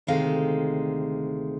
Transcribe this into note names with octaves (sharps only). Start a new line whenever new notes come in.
D2 C3 D#3 G#3 F5